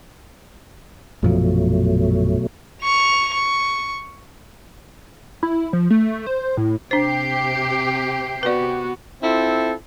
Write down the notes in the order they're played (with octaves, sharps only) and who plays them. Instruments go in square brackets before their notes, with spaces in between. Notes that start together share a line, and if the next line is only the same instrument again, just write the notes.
[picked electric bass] A#1 F#2 F3 [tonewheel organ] B2 F#3 A3
[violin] C#6 F7
C#6
[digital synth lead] E4
F3
A3
C5
A2
[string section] C3 G4 [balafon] D4 C5 [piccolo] C7
[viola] B3 F#4 [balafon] B4 D5
[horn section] C4 E4 F4 A4